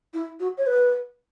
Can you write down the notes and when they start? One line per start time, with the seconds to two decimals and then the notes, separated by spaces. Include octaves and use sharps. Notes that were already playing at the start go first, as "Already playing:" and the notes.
0.14 E4
0.40 F#4
0.58 C#5
0.67 B4